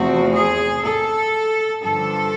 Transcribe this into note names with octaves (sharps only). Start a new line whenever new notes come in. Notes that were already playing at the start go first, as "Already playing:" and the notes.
Already playing: E2 C3 F3 A3 C4 F#4
G#4
A4
G2 D3 F3 A4